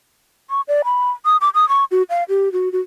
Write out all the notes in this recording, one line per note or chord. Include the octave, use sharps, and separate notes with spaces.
C#6
D5
B5
D#6
D6
D#6
C#6
F#4
F5
G4
F#4
F#4